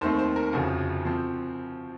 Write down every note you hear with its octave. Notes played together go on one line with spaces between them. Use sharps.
D#2 D#3 A3 C4 C5
C5
A#4
F1 F2 C#3 F3 F#4
F3 C4